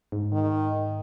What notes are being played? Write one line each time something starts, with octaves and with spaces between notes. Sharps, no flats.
G#2
D#3